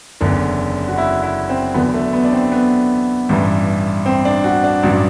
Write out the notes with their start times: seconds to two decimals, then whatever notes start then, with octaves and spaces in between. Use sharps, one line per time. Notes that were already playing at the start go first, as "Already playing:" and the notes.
0.21 F#1 E2 D3
0.88 F#4
0.98 E4
1.23 E4
1.49 C4
1.74 E2 D3 F#3 B3
1.94 A3
2.13 B3
2.25 D4
2.33 C4
2.52 B3
3.29 A1 G2 E3 G3
4.06 C4
4.25 D4
4.44 F#4
4.64 D4
4.83 A1 G2 F#3